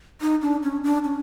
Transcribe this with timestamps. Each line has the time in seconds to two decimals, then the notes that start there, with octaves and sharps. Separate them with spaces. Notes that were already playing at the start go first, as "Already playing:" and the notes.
0.21 D#4
0.42 D4
0.63 C#4
0.84 D4
1.05 C#4